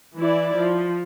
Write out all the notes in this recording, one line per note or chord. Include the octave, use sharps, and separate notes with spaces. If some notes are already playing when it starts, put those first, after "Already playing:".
E3 E4 D5
F3